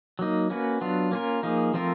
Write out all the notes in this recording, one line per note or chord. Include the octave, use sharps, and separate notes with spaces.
F#3 A#3 D#4
A#3 C#4 F#4 B4
F#3 B3 D4 F4
A#3 C#4 F4 A#4
F3 A#3 D#4 G#4
F3 A3 C4 F4 A#4